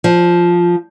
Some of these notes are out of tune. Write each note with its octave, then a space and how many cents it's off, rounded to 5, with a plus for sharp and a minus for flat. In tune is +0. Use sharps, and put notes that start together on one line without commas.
F3 +0